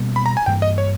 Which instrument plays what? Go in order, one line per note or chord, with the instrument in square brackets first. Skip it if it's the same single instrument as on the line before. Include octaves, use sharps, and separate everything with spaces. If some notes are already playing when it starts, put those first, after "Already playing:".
Already playing: [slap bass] B2 G3 A#3 C#4
[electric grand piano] B5
A#5
G#5
[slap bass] G2 E3 A#3 [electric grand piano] G5
[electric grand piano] D#5
C#5